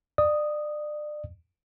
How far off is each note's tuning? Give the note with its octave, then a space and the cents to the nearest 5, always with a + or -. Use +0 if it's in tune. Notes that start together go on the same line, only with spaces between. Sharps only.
D5 +30 D#6 +0